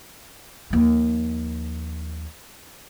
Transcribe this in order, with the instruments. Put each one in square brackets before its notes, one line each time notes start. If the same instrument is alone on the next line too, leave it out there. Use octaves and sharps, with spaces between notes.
[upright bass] D#2 F3